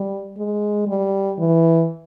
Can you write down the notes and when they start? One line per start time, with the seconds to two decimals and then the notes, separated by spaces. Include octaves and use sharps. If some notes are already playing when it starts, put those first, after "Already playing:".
Already playing: G3
0.38 G#3
0.87 G3
1.39 E3